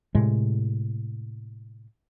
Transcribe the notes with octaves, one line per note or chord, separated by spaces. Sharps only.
A2 C3 G#3